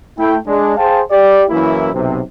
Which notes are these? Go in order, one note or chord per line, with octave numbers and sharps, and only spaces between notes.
A3 E4 G5
G#3 D4
G#4 C5 F5 G5 A5
G4 D5
F#2 E3 A#3 E4
B1 C3